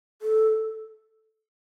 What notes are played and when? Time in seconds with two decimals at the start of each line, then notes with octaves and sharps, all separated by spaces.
0.22 A4